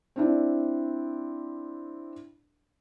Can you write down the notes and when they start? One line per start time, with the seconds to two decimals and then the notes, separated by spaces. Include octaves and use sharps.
0.16 C4 D4 E4